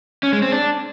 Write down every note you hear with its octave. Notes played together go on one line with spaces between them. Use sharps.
C#4
G#3
C4
D4